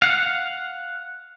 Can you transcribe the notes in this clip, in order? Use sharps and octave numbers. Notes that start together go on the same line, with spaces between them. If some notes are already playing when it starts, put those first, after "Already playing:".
F5 F#5